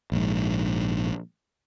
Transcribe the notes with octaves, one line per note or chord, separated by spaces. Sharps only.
A#1 G#2